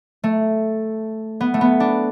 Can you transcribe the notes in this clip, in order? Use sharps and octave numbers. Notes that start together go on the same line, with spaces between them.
A3
B3
A3
B3
D4